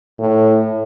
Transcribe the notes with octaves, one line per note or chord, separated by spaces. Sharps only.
A2